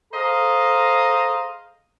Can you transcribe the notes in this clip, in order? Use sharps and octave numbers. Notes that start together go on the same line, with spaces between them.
G#4 A4 C5 D#5 F5 A#5